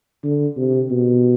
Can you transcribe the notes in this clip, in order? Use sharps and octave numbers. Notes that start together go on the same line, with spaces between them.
D3
C3
B2